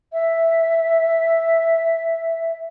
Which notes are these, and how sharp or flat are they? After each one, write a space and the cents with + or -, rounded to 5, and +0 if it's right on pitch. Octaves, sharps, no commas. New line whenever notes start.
E5 +0